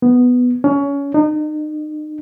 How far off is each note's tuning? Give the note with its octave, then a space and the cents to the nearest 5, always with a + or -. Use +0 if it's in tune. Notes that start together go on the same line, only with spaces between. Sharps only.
B3 +5
C#4 +25
D#4 -35